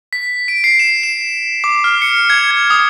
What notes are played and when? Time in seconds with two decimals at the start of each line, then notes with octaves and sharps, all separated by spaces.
0.13 B6
0.48 D7
0.64 C7
0.79 E7
1.03 E7
1.64 D6
1.84 F6
2.02 C#7
2.30 G#6
2.51 G#6
2.70 D#6